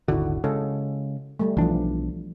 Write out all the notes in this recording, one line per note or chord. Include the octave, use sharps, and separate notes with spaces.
D#1 G#1 D3 E4 F#4
C#3 G#3 A4
G3 A3
B1 E3 F3 D4